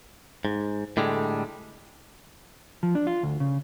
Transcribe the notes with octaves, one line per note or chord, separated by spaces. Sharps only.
G#2
A2 D3 G3 G#3
F3
D4
F4
D2
C#3